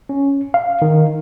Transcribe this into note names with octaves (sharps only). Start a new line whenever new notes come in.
C#4
F5
D#3